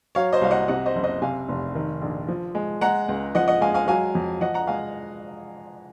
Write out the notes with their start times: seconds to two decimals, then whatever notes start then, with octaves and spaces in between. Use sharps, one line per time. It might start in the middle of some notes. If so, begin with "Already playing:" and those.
0.15 F#3 C#5 F5
0.33 C5 D#5
0.41 C2 F5
0.51 D#5 F#5
0.68 C3 D#5 F#5
0.86 C5 D#5
0.96 F#1
1.04 C5 D#5
1.22 C3 F5 G#5
1.49 F1
1.75 D#3
2.02 A#1
2.28 F3
2.55 G#3
2.81 G#3 F#5 A#5
3.09 C#2
3.35 F3 D#5 F#5
3.48 D#5 F#5
3.61 G#3 F5 G#5
3.74 F5 G#5
3.88 F#3 F5 G#5
4.15 F2
4.41 F3 D#5 F#5
4.54 F#5 A#5
4.67 G#3 F5 G#5